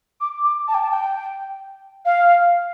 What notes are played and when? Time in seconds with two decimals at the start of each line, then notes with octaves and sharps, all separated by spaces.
0.21 D6
0.44 D6
0.68 A5
0.74 G5
0.82 A5
0.91 G5
2.05 F5